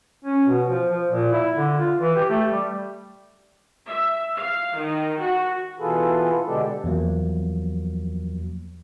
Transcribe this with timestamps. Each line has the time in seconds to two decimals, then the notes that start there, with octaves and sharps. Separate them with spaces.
0.25 C#4
0.46 B2
0.68 F3
0.90 F3
1.10 A#2
1.32 E4
1.56 D3
1.77 F4
1.99 E3
2.16 G4
2.30 A3
2.51 G3
3.87 E5
4.36 F5
4.76 D#3
5.20 F#4
5.79 B2 E3 F4 G#4 A4 B4
6.46 B2 D3 G#3 D4 G4 A4
6.84 E2 F3 F#3 A#3